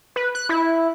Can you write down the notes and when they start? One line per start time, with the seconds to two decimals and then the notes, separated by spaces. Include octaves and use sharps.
0.16 B4
0.35 F#6
0.49 E4